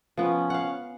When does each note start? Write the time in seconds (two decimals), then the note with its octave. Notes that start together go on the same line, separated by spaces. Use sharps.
0.17 F3 B3 C#4
0.50 F5 F#5